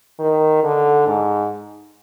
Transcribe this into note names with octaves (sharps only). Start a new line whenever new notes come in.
D#3
D3
G#2